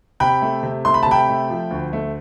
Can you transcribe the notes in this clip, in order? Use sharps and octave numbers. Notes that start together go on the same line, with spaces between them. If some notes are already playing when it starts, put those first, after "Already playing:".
C3 G5 B5
A3
C3
A3 C6
B5
C3 A5
G5 B5
A3
F3
D2
A3